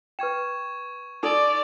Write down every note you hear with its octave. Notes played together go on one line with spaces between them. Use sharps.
B4 G5 C#6 G#6 E7
D#4 A4 D5 D6 E6 D#7